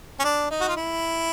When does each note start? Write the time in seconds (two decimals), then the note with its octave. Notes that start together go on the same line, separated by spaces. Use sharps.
0.19 C#4
0.24 D4
0.50 D#4
0.61 F#4
0.68 F4
0.76 E4